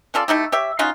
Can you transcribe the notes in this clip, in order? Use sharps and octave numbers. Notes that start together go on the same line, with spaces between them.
C#4 F4 A4 D5
A3 D#4 E4 G4
G4 C#5 E5
C#4 D#4 F4 F#4